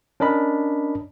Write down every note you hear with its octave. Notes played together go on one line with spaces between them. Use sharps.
C#4 D4 A#4 D#5 B5